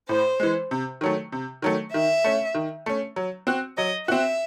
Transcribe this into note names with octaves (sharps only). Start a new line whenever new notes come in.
A2 C5
E3 G#3
C3
D#3 F#3 A3
C3
D#3 F#3 A3
D#3 E5
A3 C#4
D#3
A3 C#4
F#3
C4 F#4
F#3 D#5
C4 F#4 E5